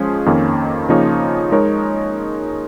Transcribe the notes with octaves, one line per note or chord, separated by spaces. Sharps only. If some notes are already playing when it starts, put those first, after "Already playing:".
Already playing: F3 G#3 C#4 G#4
F2 D#3 A#3 C#4
C#3 F3 A#3 D#4 C#5
G#3 D#4 A#4 C#5